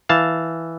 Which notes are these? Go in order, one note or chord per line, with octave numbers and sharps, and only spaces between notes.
E3 F5 A5